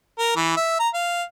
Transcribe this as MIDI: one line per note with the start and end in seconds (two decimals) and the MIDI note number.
0.19 0.34 70
0.36 0.54 52
0.57 0.78 76
0.79 0.89 82
0.94 1.23 77